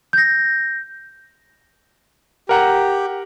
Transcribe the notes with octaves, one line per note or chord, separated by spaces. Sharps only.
G6 A#6
G4 A#4 F#5 A#5